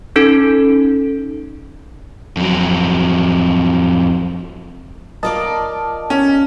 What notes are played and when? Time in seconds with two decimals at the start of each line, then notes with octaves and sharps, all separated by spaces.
0.16 C#4 D#4 A4
2.37 F2 F#3
5.23 A#3 F4 D5 D#5 A5
6.10 C#4